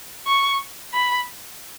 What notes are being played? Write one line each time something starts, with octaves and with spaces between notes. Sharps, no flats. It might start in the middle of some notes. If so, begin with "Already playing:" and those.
C#6
B5